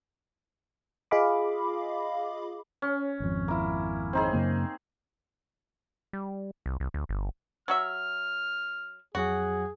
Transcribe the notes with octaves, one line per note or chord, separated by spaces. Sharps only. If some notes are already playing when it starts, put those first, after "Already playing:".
F4 G#4 D#5 F5 B5 D6
C#4
G#1 F2
A#3 E4
C4 D#4 G#4
F#2 C#3 A#3
G3
C2
C2
D2
G1
F#3 F#4 E5 F6
F2 F#3 F#4 G#4 F#5